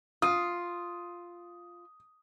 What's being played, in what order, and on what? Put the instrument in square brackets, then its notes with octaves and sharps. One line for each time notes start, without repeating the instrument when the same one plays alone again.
[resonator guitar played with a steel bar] F4 [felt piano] D#6